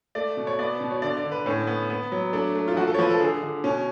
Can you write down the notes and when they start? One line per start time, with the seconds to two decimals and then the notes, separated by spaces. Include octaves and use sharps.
0.15 A3 D5
0.37 B2
0.47 C#5
0.59 B3 D5
0.81 B2
0.91 C#5
1.02 D3 D5
1.17 D5
1.24 D3
1.32 B4
1.46 A2 C#4
1.67 B3
1.90 B3
2.12 F#3
2.33 A3 D4
2.55 A3
2.68 F4
2.76 F3 F#4
2.87 A4
2.94 C#5
2.99 F3 B4
3.10 A4
3.20 D3 G#4
3.42 D3
3.64 B2 C#4